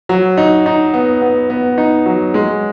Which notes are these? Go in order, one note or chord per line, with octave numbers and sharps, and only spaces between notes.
F#3
D#4
D#4
B3
B3
B3
D#4
F#3
G#3